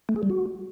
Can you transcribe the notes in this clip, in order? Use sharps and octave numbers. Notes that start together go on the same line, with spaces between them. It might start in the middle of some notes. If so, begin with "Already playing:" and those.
A3
G#4
G3
F#4